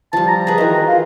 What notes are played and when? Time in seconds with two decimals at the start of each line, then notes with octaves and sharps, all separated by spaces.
0.13 F3 G3 A5
0.28 A#5
0.47 G#4 B4
0.58 D#3 E3 F#4
0.88 F4